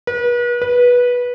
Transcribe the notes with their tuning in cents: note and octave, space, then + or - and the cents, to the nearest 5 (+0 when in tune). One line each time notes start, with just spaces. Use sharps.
B4 -40
B4 -15